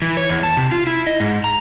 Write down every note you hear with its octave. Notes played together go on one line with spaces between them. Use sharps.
E3
C#5
E2
A5
C3
F4
E4
D#5
G#2
A#5